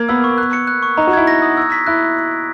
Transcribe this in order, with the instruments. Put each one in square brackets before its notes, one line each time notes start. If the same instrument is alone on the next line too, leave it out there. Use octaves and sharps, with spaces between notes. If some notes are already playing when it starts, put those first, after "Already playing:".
Already playing: [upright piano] A#3 [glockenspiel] G#6
[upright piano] B3 [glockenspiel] E6
[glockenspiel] C#6
F#6
C#7
F#6
C#6
[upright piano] D#4 [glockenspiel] A#5
[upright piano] F#4
[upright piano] E4 [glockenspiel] G#6
[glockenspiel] A#6
D#6
E6
B6
[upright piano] E4 [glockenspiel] F#6